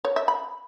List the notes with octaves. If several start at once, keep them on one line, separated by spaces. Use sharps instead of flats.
C#5
E5
B5